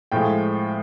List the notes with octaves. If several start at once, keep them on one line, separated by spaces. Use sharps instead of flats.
A2 F3 G#3 G5